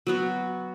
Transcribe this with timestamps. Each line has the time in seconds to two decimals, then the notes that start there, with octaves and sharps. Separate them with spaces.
0.07 F#3 B3 F#4